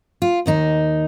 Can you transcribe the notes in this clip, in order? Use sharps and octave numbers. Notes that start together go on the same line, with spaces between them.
F4
D#2 D#3 D#4